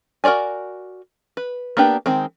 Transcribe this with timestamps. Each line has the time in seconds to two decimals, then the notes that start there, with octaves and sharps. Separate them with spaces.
0.24 F#4 A#4 C#5 D5 G#5
1.37 B4
1.77 A#3 B3 D4 G4 B4
2.06 D#3 G#3 C4